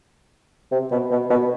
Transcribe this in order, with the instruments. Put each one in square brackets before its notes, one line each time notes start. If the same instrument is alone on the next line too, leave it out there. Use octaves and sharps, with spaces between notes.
[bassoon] C3
B2
B2
B2